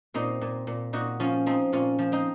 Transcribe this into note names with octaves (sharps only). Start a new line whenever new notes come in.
A#2 C4 D#4
A#2
A#2
A#2 D#4 F#4
F3 C#4 F4
F3 C4 D#4
A#2 C#4 F4
F3
C4 D#4